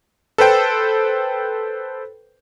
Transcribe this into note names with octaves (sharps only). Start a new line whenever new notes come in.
A4 B4 C5 G5